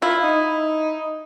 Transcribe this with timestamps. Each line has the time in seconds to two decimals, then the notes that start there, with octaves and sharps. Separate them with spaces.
0.02 E4 F4
0.23 D#4